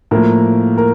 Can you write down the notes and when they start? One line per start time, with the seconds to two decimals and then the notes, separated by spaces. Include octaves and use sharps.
0.11 A2 F3 A#3 A#4
0.78 A#4